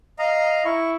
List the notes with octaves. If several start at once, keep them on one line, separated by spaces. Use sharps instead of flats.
D#5 F5 A#5
E4 C#6